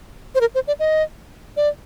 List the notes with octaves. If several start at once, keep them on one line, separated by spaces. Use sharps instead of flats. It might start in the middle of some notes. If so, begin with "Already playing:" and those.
C5
A#4
C5
D5
D#5
D5